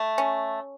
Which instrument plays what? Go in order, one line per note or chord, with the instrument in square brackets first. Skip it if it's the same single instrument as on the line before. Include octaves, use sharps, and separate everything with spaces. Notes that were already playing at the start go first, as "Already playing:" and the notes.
Already playing: [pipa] A3
C#4